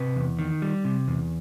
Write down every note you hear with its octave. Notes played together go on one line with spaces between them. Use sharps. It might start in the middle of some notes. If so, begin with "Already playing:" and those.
Already playing: C3 B4
E2
D#3
G3
C3
E2